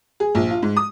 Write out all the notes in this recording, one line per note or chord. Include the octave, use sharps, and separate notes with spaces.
G#4
A#1
F4
G#2
D#6